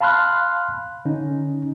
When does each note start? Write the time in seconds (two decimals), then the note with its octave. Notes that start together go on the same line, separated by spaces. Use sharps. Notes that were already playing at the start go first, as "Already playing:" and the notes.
0.01 F5 A5 B5 C6 F6 F#6
1.05 D3 C#4 D#4